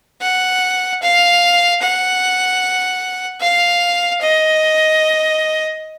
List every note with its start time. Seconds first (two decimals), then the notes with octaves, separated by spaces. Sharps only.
0.21 F#5
1.02 F5
1.82 F#5
3.41 F5
4.21 D#5